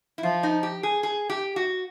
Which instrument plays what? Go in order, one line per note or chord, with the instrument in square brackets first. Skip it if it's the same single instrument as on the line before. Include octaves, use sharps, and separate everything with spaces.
[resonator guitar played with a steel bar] E4
[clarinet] F3 [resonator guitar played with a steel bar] F4
[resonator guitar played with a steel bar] D#4
G4
G#4
G#4
G4
F#4